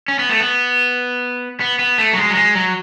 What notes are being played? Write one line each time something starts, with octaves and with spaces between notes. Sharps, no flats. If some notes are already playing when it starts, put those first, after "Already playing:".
C#4
B3
A3
B3
B3
B3
A3
F#3
G#3
F#3
G#3
F#3